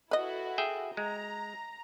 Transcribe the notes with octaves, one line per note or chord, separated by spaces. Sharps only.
E4 F#4 A4 B4 D#5
G#4 E5 G5
G#3 A#5